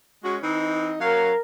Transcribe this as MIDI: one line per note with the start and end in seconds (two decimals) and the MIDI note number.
0.24 0.38 56
0.24 0.38 61
0.24 0.38 66
0.43 0.95 52
0.43 0.95 60
0.43 0.95 63
1.01 1.33 54
1.01 1.33 61
1.01 1.40 70
1.01 1.33 77